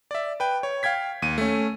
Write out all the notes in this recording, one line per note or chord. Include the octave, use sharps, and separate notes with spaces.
D5 E5
B4 G5
C#5
F5 G5 G#6 B6
D#2 D#7
A3 C#4